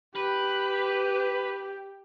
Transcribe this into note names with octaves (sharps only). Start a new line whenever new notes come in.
G4 B4